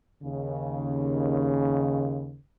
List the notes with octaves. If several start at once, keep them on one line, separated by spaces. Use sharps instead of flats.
D#2 C#3